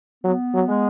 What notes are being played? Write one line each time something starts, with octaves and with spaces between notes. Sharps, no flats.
F#3 B3
F#3
G#3